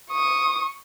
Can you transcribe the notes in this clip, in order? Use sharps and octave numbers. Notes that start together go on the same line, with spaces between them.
C#6 D#6